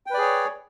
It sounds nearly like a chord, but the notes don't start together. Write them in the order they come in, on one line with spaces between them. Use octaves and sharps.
G5 B4 D5 G#4 C#5